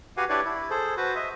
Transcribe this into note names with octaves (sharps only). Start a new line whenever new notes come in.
F#4 G4 B4 F5 F#5 G#5
D4 E4 G4 B4 C#5 D5
E4
G#4 A4 C5
F#4 B4 C5
D#5 E5